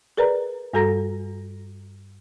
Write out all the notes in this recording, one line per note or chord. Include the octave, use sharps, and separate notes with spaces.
G#4 A#4 B4 D5 A#5
G2 G3 F#4 A4 A#5 A#6